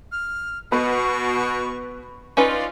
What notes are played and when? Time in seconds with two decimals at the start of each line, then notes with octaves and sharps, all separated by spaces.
0.12 F6
0.72 B2 B3 B4 C#6
2.37 C#4 D#4 F4 B4 D5